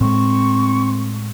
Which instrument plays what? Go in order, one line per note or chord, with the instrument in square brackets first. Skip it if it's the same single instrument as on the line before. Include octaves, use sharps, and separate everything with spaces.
[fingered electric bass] A2 G#3 [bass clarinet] C4 [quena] C#6